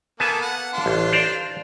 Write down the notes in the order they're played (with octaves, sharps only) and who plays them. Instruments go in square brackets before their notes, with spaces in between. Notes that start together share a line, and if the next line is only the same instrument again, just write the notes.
[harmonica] A#3 A4 [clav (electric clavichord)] B3 G#5 A5
[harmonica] F#5
D4 F4 C6
[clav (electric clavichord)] A1
C5 D5 A#5